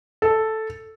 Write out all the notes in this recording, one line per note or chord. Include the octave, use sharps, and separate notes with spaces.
A4